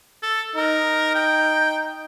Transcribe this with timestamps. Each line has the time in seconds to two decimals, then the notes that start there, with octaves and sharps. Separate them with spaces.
0.22 A4
0.55 D#4 A#4
1.15 G5